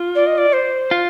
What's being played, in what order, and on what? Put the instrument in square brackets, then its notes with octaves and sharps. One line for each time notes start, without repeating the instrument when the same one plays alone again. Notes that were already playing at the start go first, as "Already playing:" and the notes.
Already playing: [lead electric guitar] F4
[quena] D5
D#5
D5
C5
[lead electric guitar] F4